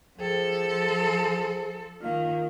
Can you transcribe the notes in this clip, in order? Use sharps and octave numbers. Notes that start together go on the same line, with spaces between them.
F3 G#4 A4 C5 G5
D#3 A#3 F4 F5